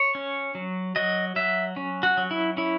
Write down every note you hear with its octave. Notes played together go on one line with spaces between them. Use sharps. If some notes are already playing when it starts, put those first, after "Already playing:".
Already playing: C#5
C#4
F#3
F#3 D#5
F#3 E5
C#4
F#4
F#3
E4
C#4 E4